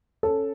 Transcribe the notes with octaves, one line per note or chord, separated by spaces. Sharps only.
C#4 A4